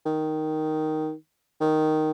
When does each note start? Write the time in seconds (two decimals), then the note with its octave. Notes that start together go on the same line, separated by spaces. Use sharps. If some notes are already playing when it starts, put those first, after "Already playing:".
0.06 D#3
1.60 D#3